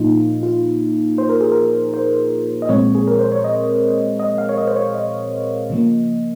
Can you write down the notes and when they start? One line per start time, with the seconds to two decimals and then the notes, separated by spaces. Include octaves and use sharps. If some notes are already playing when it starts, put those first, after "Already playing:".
Already playing: A#2 F3 A#3 D#4 F4
0.43 F4
1.18 C5
1.29 A#4
1.41 G#4
1.52 A#4
1.94 C5
2.62 D#5
2.69 A#2 F3 G#3 C4 C#5
2.95 G#4
3.08 A#4
3.19 C5
3.32 C#5
3.44 D#5
4.20 D#5
4.38 F5
4.49 C#5
4.57 D#5
4.67 C5
4.76 C#5
4.94 D#5
5.70 C#3 F3 A#3